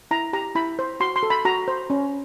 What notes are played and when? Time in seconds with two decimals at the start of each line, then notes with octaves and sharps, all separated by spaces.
0.11 E4 A#5
0.33 G4 A#5
0.55 E4 B5
0.79 C5
1.00 F#4 C6
1.16 C6
1.23 A4
1.30 B5
1.45 F#4 A#5
1.68 C5
1.90 C#4